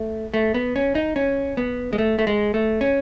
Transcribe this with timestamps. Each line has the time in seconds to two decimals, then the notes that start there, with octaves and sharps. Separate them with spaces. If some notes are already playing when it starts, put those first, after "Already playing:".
Already playing: A3
0.34 A3
0.54 B3
0.76 C#4
0.95 D#4
1.16 C#4
1.57 B3
1.93 G#3
1.98 A3
2.19 A3
2.27 G#3
2.54 A3
2.81 C#4